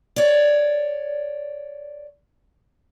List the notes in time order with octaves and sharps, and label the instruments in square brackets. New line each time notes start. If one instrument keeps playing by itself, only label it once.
[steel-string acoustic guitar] C#5 D5